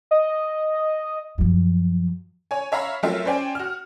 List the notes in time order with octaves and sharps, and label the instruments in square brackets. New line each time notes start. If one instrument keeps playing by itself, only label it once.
[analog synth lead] D#5
[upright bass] F#2 F3
[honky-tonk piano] C#5 G#5
C#5 E5 F5 A#5 B5
F#3 A3 C4 F4 A#4 E5
C#4 C5 D5 G5 G#5
F#4 F6